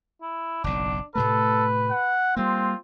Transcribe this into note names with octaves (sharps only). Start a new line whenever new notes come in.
E4
F#1 B1 D4
A2 C3 A3 A4 B4
F#5
G3 A#3 C4 F4